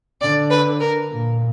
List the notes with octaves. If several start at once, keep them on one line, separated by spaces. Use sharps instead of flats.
D3 D5
B4
A#4
A#2